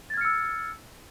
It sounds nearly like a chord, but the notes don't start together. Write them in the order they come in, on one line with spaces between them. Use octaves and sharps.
A6 G#6 F6 C#7 E6